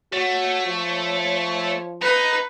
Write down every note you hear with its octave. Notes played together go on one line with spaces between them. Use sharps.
A3 F#4 C#5
F3
D#4 B4